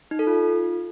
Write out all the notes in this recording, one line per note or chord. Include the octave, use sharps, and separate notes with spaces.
D#4
A4
F4